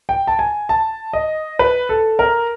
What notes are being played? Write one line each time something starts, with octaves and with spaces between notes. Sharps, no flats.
G5
A5
G#5
A5
D#5
B4
A4
A#4